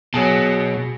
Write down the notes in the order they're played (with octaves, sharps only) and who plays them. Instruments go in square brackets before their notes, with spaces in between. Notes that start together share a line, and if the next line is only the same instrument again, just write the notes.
[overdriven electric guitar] B2 [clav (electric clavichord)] F#3 G#4 A5